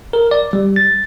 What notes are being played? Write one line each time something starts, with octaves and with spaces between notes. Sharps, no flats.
A#4
D5
G3
A6